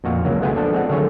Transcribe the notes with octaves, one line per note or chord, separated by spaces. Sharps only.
F2 A#2 F#4 F5
C#2 F#3 A#3
G#3 A3 B3 F4 G5 G#5
F3 D4 A4
G#3 C4 F#5
D3 D#3 F#3 A3 G#4 C#5